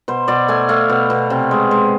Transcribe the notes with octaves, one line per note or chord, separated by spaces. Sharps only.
B2 C5
B2 D5
A3 G#5
A3 F5
B2
B2
C3
G#3
G#3